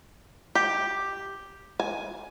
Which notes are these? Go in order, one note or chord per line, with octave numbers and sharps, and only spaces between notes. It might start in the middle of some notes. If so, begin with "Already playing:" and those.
G4
G#5